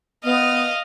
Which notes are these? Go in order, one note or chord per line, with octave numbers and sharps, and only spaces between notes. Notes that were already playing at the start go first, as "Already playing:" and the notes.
B3 D#5 F5